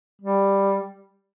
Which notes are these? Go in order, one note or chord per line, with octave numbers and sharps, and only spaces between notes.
G3